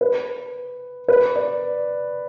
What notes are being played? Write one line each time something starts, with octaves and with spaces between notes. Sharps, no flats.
B4
B4
D5